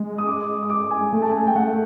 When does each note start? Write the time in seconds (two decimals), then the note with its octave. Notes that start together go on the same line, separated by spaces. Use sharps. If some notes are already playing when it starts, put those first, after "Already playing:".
Already playing: G#3
0.18 D#6
0.27 D6
0.63 D#6
0.70 D6
0.91 G#5
1.13 A3 G#5
1.22 A5
1.31 G#5
1.47 G5
1.56 A3 F#5